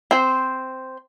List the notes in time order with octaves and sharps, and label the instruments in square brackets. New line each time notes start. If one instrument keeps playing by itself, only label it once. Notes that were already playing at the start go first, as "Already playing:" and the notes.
[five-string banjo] C4 C5